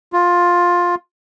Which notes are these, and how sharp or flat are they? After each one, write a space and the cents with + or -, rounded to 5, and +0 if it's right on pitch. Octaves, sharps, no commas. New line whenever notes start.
F4 +10